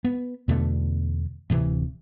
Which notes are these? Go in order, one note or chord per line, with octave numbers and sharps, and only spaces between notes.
B3
E2 B2 D3 A3
D1 C3 E3